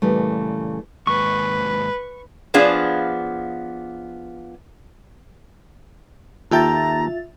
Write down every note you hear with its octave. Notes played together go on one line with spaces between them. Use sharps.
A#2 C#3 E3 G3 A3
D#2 G#2 B4 C#6
F3 B3 D4 G#4 F5
D#2 F4 A4 E5 G5 A#5 A6